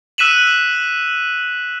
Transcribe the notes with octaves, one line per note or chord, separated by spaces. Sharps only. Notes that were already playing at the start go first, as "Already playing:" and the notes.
E6 F#6 B6 D#7 E7 F#7